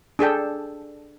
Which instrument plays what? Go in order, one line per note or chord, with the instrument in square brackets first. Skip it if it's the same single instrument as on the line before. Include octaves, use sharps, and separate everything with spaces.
[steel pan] D4 G#4 A4 G5